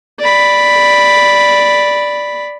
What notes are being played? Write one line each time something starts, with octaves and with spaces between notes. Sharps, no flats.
D5 B5